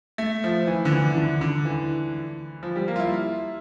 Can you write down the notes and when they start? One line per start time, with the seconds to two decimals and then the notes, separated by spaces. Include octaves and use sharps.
0.18 A3
0.44 F3
0.67 E3
0.85 D3
0.92 E3
1.17 D3
1.41 D3
1.65 E3
2.63 F3
2.76 G3
2.88 A#3
2.96 F4
3.00 E4